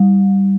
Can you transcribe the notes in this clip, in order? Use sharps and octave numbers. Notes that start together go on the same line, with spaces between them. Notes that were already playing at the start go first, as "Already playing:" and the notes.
Already playing: G3